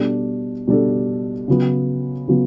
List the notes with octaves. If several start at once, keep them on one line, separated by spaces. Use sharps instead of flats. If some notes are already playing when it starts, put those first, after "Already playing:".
Already playing: B2 G3 D4 A4
B2 G3 D4 A4
C#3 F#3 B3
C#3 F#3 B3